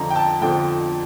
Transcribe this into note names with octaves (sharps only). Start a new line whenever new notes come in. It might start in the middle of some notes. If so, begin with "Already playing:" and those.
Already playing: F2 D3 F3 A#5
G5
A5
F2 D3 F3 G5